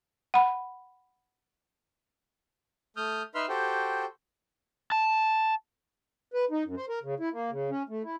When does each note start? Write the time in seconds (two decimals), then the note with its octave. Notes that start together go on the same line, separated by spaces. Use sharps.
0.34 F#5 B5
2.97 A3 D#6 F6 G6
3.35 D#4 B4 E5 C6 E6 F6
3.49 F#4 G4 A4 C5 G5
4.92 A5
6.34 B4
6.51 D#4
6.65 F#2
6.77 C5
6.89 A#4
7.03 C#3
7.20 E4
7.33 A#3
7.51 C#3
7.70 C#4
7.89 A3
8.04 E4